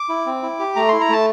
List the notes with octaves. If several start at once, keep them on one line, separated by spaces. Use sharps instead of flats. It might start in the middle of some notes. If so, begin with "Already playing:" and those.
Already playing: D6
E4
C4
E4
G4
A3 A#5
E4 C6
A#5
A3 A5